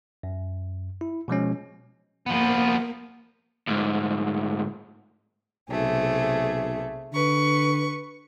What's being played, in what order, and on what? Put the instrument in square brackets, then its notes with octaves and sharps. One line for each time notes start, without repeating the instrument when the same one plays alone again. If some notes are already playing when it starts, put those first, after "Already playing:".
[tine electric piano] F#2
E4
B2 F3 G#3 C#4
[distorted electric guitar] F3 B3 [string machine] A#3
[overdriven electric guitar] D2 G#2
[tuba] B1 [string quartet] C3 A3 G#4
[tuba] D3 [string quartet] B4 C#6